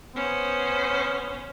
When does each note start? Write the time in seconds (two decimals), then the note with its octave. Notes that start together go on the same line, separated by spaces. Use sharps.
0.16 B3 C#4 C5